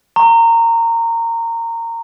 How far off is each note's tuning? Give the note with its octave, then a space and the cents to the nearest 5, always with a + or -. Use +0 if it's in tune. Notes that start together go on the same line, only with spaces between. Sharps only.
A#5 -20 C#6 -40